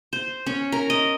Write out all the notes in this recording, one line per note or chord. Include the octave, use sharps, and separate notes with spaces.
C5
C#4
A#4
D#5